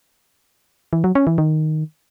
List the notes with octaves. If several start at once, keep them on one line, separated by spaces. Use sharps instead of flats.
E3
F#3
C#4
E3
D#3